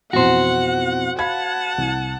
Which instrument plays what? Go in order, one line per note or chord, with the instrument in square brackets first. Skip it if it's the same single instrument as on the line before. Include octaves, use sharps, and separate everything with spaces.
[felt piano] F2 B2 E3 [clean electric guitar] F#4 C5 [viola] F#5
[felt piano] F5 B5 G#6 [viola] F#5 A5
[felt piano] C2